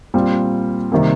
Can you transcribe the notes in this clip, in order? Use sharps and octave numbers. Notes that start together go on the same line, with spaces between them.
A#2 G3 C4 F4
C3 D#3 G3 A#3